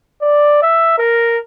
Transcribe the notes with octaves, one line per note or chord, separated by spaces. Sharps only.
D5
E5
A#4